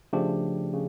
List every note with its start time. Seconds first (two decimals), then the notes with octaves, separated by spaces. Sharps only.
0.13 C#3 F3 A3 D4 G4
0.73 C#3